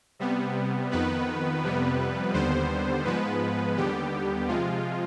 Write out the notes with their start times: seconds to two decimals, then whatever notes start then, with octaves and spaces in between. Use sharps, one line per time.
0.19 C3 G3 B3
0.91 F2 D#3 B3 B4
1.63 F2 C3 G3 B3
2.34 D#2 D3 G3 B3 C5
3.05 G#2 F3 G#3 B3 B4
3.77 D#2 D3 G3 B3 G4
4.48 C3 F3 G#3 F4